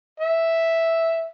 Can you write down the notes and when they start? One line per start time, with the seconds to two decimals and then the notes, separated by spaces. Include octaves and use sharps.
0.20 E5